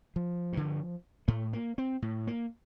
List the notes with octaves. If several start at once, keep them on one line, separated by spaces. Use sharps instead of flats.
F3
G2 D3
A2 A3
A#3
C4
A2
A#3